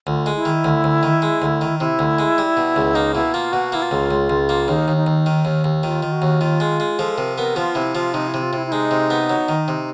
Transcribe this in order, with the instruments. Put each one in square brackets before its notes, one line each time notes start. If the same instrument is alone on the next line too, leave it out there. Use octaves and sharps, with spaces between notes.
[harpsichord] D2 [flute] F4
[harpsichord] G#3
[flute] E4
[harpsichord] D#3
D2
D2
D#3
G#3
D2
D#3
[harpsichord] C3 [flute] E4
[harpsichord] D2
G#3
G3
B2
C#2
[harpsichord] A#3 [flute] D#4
[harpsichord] B2 [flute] E4
[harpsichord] A#3 [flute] F4
[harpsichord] B2 [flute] F#4
[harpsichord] A#3 [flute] E4
[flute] F4
[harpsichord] C#2
C#2
C#2
A#3
[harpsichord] D#2 [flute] D#4
[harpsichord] D#2
[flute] D#4
[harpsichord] D#2
D#3
D#2
D#2
[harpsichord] D#3 [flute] F4
[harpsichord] D#3
[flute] F#4
[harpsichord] D#2
[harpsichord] D#3 [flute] F4
[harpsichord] G#3
G#3
[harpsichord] F3 [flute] A4
[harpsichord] C3 [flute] A#4
[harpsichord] B3 [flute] A#4
[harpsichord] F3 [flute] F4
[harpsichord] C3 [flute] E4
[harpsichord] F3 [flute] F4
[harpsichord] C3 [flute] D#4
[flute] E4
[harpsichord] C3
[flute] F4
[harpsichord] C3 [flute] E4
[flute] E4
[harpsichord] G#3 [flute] D#4
[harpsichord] C3
B3
F#3
D#3
C3